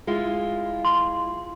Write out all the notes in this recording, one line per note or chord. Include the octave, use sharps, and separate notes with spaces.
G#3 E4 F4
C6